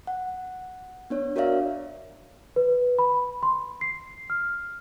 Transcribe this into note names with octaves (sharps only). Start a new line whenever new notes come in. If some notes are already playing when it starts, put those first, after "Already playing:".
F#5
B3 D4 C#5
F#4 A#4 C#5 D5 E5 F5
B4
B5
C6
C7
F6